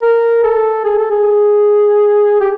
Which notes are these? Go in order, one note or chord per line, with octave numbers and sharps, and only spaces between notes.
A#4
A4
G#4
A4
G#4
G4